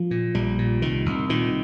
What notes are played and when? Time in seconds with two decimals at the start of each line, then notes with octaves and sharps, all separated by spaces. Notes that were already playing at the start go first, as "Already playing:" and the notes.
Already playing: F3
0.11 A#2
0.35 A#1 G3
0.58 A#2
0.82 C2 D#3
1.06 C2
1.29 A#2 D#3